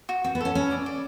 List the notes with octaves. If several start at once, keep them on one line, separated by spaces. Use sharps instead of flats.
F#4
C4 F#4
B3
C#4 A4
C#4 B5
D5
D5